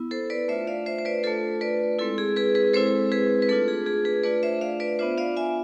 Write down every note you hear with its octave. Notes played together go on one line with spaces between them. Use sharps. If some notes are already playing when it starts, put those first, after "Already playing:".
Already playing: B3 E4
A4 C5
B4 D5
A3 D4 F4 C5 E5
D5 F5
C5 E5
C5
B4 D5
A3 D4 F4 A4 C5
B4 D5
G#3 C4 E4 A4
G#4
G#4 B4
G#4 B4
G#3 C4 E4 A4 C5
G#4 B4
B4
A3 D4 F4 A4
G#4
G#4
G#4 B4
A3 D4 F4 B4 D5
C5 E5
D5 F5
B4 D5
B3 D4 F4 C5 E5
D5 F5
E5 G#5